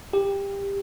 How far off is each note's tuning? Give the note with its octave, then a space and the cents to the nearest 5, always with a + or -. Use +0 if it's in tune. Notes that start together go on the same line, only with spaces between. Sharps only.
G4 +20